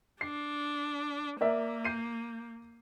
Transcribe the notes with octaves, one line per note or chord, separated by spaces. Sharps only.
D4 C7
A#3 A#4 D5 E5
G6 C7 D#7